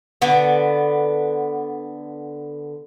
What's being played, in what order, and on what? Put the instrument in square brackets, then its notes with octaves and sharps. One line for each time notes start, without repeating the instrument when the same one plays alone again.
[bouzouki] D3 B3